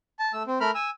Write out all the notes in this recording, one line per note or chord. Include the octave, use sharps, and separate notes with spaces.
A5
A3 E6
C4
A3 A#4 B5 F6
G#5 E6